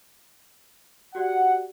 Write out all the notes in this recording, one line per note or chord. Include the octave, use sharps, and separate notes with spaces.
F#4 G4 D5 F#5